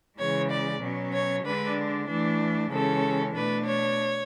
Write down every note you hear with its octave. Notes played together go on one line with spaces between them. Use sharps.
C#3 E3 G#3 C#5
D5
B2 F#3 C#4
C#5
D3 G#3 D4 B4
E3 A3 D4
C#3 E3 G#3 C#4 A4
B2 A3 D4 B4
C#5